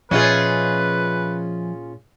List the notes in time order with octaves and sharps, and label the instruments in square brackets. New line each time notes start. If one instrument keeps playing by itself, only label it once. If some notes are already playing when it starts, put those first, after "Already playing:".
[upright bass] A#2 [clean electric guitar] F3 D#5 E5 [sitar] C#4 F4 G#4 [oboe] B4